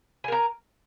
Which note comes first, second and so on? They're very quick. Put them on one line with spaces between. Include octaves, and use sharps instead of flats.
G#5 A#4 A#5